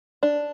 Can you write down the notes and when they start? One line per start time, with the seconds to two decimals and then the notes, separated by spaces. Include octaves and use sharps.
0.23 D4